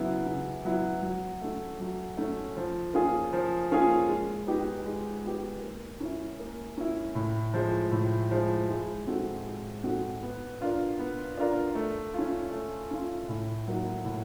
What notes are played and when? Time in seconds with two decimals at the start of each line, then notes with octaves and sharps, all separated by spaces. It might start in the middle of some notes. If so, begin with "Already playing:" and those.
Already playing: C#3 F#3 B3 E4
0.26 C#3
0.65 F#3 B3 E4
1.02 F#3
1.41 A3 C#4
1.80 F#3
2.17 A3 C#4
2.57 F3
2.94 A#3 C#4 F4 G#4
3.33 F3
3.71 A#3 C#4 F4 G#4
4.09 G#3
4.47 B3 D#4 G4 B4
4.86 G#3
5.24 B3 D#4 G4 B4
5.62 A#3
6.00 C#4 E4
6.39 A#3
6.77 C#4 E4
7.15 A2
7.54 F3 G#3
7.92 A2
8.31 F3 G#3
8.69 G#3
9.07 C4 D#4 F#4 A4
9.46 G#3
9.83 C4 D#4 F#4 A4
10.22 B3
10.61 D4 F4 A#4
10.99 B3
11.37 D4 F4 A#4
11.75 A3
12.14 C#4 F4
12.51 A3
12.91 C#4 F4
13.29 A2
13.68 F#3 A#3 D#4
14.05 A2